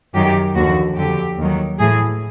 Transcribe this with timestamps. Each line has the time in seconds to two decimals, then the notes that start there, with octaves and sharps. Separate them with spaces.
0.14 F#2 D#3 F#3 G4
0.55 D#2 D3 F3 F#4
0.97 F2 D3 F#3 G4
1.38 D#2 D#3 F#3
1.80 A2 E3 G#4